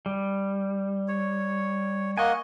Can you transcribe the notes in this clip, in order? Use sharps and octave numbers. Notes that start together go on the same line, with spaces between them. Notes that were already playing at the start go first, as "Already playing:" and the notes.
G3
C#5
A#3 D#5 F#5 G#5 C#6